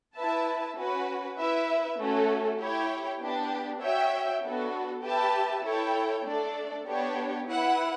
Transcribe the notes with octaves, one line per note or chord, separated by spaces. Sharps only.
E4 B4 E5 A5
C#4 F#4 B4
E4 B4 E5
A3 C#4 F#4 A4
E4 G4 C#5 G5
B3 D4 G4
F#4 C#5 E5 G5
B3 D4 F#4 A4
G4 B4 E5 A5
E4 A4 C#5 G5
A3 D4 A4 D5
B3 D4 G4 C#5
E4 B4 F#5